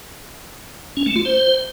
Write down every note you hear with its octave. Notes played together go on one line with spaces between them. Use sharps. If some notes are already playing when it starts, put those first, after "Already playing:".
C#4
A3
F4
C5